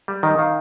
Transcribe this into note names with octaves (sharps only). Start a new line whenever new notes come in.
G3
D#3 D#5
D#3 F5